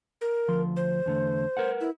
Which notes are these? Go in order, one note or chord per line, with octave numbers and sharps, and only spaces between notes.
A#4
D2 F3 C6
C5
E2 D3 A3
A#4 B4 F#5
E4